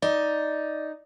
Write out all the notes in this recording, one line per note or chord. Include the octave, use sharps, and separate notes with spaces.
D#4 D5